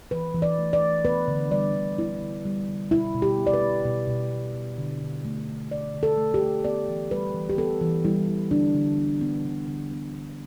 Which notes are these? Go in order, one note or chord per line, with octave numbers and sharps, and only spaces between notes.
E3 B4
E3
D5
A3
D5
A3
B3 B4
D3
G3 D5
D3
B3 E4
D3
G3
D3
B2 E4
B2
G4
B3
D5
B4
B3
B2
B2
B3
B3
D3
D3
A3
A3
D3 D5
D3
A4
A3
G4
A3
B3 D5
E3
G3 B4
E3
G4
B3 A4
E3
G3 E4
E3
D3 D4
D3
B3
B3
D3
D3
B3
B3